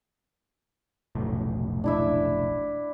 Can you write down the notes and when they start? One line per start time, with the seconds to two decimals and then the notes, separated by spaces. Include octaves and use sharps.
1.15 F1 B1 A2
1.84 D4 E4 E5